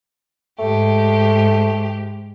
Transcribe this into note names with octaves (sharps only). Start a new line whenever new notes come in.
G#2 A3 G4